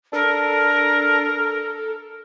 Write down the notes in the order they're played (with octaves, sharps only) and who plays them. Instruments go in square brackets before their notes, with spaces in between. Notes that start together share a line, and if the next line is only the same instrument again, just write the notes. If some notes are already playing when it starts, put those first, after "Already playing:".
[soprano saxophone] D4 [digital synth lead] A4 [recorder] A#4